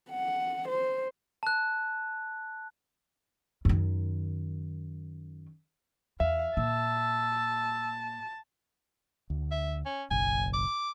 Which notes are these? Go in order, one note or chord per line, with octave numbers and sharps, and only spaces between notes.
F#5
C5
A5 F#6
F#2 D#3
E2 E5 F5
A#2 A5 E6
D2
E5
C#4
F#1 B1 G#5
D6